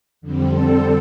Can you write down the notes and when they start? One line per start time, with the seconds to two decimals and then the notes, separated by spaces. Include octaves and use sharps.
0.21 F2 D3 G3 C4
0.50 A4